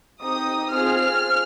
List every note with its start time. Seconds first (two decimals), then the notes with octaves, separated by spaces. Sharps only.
0.21 C4 D#4 G4 D#6
0.69 C4 F4 G#4 F6